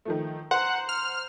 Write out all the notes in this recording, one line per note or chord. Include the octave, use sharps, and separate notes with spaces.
D#3 F3 A3
C5 F#5 A#5
F6